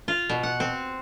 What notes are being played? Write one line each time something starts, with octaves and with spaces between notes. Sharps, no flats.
F4
B2
F#5
C4